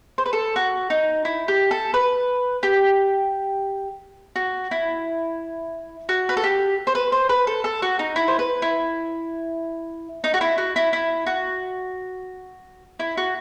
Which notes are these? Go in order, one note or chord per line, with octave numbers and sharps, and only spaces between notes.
C5
B4
A4
F#4
D#4
E4
G4
A4
B4
G4
F#4
E4
F#4
B4
A4
G4
C5
B4
C5
B4
A4
A4
F#4
D#4
E4
C5
B4
E4
D#4
F#4
E4
F#4
E4
E4
F#4
E4
F#4